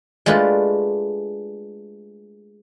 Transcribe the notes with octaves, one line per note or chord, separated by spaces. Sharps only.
G#3 A3 D4 F4 G4 B4